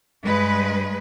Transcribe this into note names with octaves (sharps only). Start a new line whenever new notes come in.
G2 G#3 B4